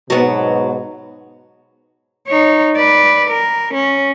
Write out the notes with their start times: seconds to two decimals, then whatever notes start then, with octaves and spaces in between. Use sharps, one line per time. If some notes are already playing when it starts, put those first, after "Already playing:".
0.10 G#2 B2 F#3 B3
2.27 D#4 C#5
2.76 B4 D5
3.29 A#4
3.74 C#4